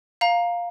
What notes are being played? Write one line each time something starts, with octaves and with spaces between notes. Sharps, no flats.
F5 A#5